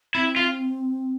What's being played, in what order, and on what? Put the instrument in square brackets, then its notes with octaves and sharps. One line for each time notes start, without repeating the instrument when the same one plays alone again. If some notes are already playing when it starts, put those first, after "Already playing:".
[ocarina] C4 [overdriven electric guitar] E4
[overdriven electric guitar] F4